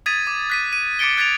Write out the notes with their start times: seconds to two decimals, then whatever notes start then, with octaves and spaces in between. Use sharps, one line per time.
0.06 D#6 G#6 A6 B6 D#7
0.27 D6
0.50 F#6 B6 D#7
0.73 D#7
0.99 D6 G#6 A6 C#7 D7 G7
1.17 F#6 G#6 A6 B6 D7 F7